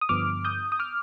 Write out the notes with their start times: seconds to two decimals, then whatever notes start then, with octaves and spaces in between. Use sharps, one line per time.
0.01 D#6
0.09 G2 D3 F3 B3 D6 F6
0.45 D#6 G6
0.72 D#6
0.79 D6 F6